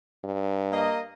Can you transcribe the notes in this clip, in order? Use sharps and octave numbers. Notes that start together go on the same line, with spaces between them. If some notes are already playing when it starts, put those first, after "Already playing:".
G2
A#3 D#5